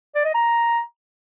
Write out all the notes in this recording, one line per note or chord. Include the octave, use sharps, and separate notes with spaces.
D5
D#5
A#5